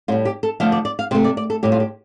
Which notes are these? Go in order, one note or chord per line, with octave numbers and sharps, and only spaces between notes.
A2 G3 F4
G4
A4
D3 F3 A3 F5
D5
D5
F5
C3 A3 C5
D5
D5
A4
A2 G3 G4
F4
G4